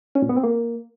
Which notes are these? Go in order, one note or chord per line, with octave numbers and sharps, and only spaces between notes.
C#4
A#2
B3
C4
A#3